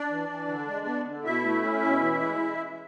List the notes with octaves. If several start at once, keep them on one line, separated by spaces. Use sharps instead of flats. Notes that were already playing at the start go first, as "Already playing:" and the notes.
Already playing: D4 D5
E3
E3
D3
G#3
B3
D3
B2 E4 E5
A3
C#4
B2
E3
G#3